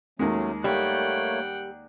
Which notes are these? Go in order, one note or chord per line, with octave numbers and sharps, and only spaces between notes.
D#2 D#3 F#3 G#3 A3 C#4
G3 A3 A#3 C#5 F#5 G5